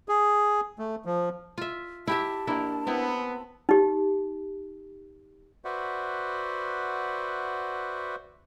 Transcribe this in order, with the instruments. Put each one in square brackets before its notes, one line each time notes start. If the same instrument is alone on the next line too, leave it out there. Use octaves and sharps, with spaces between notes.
[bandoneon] G#4
A3
F3
[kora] F4 E5
[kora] E4 G4 E5 [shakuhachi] A5
[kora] A#3 E4 [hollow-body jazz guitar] D4 A#4
[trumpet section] B3 [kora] C4 E4
[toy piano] D#4 G4
[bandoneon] F#4 B4 C5 D5 E5 F#5